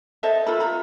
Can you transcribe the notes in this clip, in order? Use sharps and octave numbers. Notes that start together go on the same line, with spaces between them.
A4 C5 D#5 E5
F4 A4 B5
F4 A#5 B5